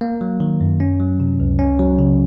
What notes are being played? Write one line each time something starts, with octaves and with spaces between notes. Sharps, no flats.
A#3
F#3
D#3
F#2
C#4
F#3
C3
C#2
C#4
F#3
C#3